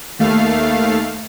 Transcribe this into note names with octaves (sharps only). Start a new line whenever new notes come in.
D#2 A3 F5